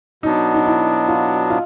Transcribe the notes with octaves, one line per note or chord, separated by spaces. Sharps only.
B2 F#3 B3 D4 D#4
D#4
E4
F4
F4